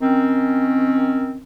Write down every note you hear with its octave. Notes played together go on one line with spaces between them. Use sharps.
D#3 C4 C#4